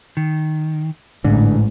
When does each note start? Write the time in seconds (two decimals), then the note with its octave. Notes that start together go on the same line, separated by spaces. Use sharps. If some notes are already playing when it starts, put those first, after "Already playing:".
0.17 D#3
1.24 A1 G#2 D3